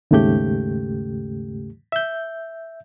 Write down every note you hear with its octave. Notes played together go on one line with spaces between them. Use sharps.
D#2 G#2 C#3 A3 G4 G6
E5 G6